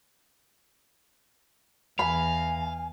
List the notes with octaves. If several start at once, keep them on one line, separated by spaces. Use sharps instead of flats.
E2 F5 G#5 B5